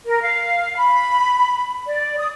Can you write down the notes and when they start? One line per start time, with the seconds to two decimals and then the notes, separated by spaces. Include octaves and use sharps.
0.05 A#4
0.22 F5
0.77 B5
1.87 D5
2.18 D#6